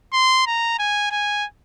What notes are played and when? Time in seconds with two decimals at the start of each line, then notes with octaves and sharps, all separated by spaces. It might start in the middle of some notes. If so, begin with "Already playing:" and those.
0.13 C6
0.47 A#5
0.79 G#5
1.11 G#5